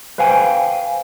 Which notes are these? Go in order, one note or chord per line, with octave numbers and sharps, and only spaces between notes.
B4 C5 F5 G5 G#5